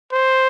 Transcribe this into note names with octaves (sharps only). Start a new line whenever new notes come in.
C5